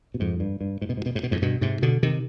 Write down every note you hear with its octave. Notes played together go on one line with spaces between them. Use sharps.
B2
F2 G#2
G2
G2
G#2
B2
G#2
B2
G#2
B2
F2 G#2
G2 B2
G#2 C3
B2 D3
C3 D#3